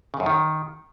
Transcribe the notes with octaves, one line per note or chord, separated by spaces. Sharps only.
C#3
F#2
D#3